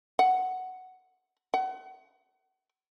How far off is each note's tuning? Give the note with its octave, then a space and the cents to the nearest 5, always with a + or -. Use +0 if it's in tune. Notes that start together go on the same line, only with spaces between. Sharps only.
F#5 +5
F#5 +40